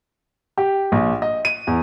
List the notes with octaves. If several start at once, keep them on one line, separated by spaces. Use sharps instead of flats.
G4
A#1
D#5
D#7
E2